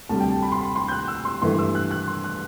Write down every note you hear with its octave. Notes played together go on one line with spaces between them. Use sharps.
D2 C3 G3 A5
G5
A5
B5
C6
B5
C6
G6
F#6
E6
C6
G2 E3 A3 C6
E6
F#6
F#6
C6
F#6